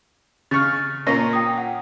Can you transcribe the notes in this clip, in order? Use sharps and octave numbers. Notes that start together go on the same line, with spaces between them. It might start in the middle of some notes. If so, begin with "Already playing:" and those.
C#3 C#6 F6 A6
A#2 A#3 C#4 F4 A#5 A#6
G5 D#6
F#5